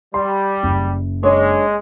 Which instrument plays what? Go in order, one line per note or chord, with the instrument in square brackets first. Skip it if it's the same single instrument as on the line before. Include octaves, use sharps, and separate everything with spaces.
[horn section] G3 [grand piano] C6
[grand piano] F#1
[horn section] G#3 [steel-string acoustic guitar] D4 C#5